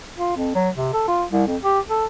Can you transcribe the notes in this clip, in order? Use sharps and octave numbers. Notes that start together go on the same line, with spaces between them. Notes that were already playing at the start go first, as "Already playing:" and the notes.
F4
F2
F#3
C3
A4
F4
C2
F2
G4
A4